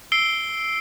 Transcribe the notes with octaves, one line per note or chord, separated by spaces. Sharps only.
E6 C7 D7 G7